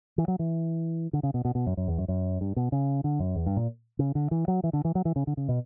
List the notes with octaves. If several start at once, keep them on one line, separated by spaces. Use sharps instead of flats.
E3
F#3
E3
D3
C#3
B2
B2
B2
F#2
F#2
E2
F#2
F#2
G2
B2
C#3
D3
F#2
E2
G2
A#2
C#3
D3
E3
F#3
E3
D3
E3
F#3
E3
C#3
D3
C#3
B2